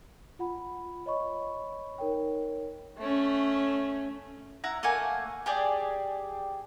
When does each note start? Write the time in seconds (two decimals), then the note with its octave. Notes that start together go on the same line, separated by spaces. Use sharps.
0.39 F4 F#5 B5
1.06 C#5 D#5 B5 C#6
1.98 D#4 A#4 C#5 G5
2.97 A3 C#4
4.64 E4 F#5 A#5
4.83 A3 A#3 F#5 G#5
5.46 G4 G#4 D5